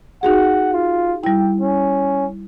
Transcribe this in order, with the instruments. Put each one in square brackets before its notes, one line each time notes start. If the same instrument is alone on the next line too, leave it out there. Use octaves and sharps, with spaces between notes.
[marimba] D#4 F#4 G#4 [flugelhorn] F#5
[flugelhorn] F4
[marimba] G3 E4 [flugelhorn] G5
[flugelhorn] C#4